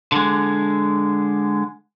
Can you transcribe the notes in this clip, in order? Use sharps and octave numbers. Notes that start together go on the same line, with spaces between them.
D3 G#3